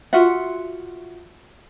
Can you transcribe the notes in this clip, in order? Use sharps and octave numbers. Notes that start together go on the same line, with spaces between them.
F4 F#4 E5 F#5